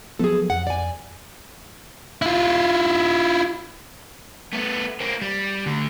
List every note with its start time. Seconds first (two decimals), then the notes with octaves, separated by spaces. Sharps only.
0.19 F3 F#3 B3 G#4 A4
0.50 F2 F#5
0.67 D5 G#5
2.22 E4 F4
4.53 A3 B3
5.00 A#3 C4
5.21 G3
5.66 D2 D3